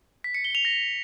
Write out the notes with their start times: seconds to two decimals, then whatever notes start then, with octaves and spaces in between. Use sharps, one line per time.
0.24 B6
0.34 C#7
0.45 G7
0.55 F7
0.65 A#6